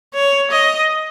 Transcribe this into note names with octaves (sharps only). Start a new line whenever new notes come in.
C#5
D#5